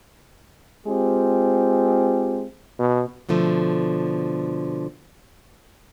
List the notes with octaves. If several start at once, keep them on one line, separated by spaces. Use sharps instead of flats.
G#3 C4 F4 G4
B2
B2 D3 F3 A3